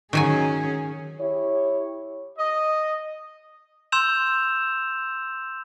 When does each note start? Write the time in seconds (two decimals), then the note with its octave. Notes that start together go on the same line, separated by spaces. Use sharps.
0.13 D#3 F#3 C#4 G#4 G#5
1.20 E4 G4 C#5
2.38 D#5
3.92 C6 E6 G6 E7 F7